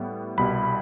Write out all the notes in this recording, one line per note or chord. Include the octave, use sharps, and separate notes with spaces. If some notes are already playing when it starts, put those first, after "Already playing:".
Already playing: A2 G3 B3
C2 B2 G3 B5